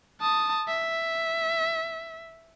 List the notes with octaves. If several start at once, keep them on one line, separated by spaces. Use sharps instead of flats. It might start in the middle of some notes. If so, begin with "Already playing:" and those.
A5 D#6
E5